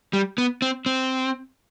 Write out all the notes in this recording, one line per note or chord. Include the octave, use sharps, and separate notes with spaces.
G3
B3
C4
C4